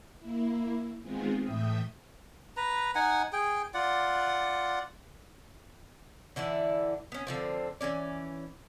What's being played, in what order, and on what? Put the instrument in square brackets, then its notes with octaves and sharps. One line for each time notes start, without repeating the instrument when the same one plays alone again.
[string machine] A#3 E4
D#3 G#3 B3 C4 F4 G#4
A2 E3 E5 G5 D#6
[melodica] B4 A#5
D#4 F#5 G#5
G#4 G5
F4 D5 F#5
[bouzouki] D3 E3 E4 D5
B3 C#4
D3 F3 C4
E3 A#3 C#4 D5